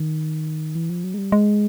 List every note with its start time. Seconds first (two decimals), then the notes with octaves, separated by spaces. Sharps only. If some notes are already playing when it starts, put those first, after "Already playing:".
Already playing: D#3
0.75 E3
0.90 F3
1.04 F#3
1.14 G#3
1.18 G3
1.32 G#3